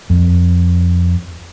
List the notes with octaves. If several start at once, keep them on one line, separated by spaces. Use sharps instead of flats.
F2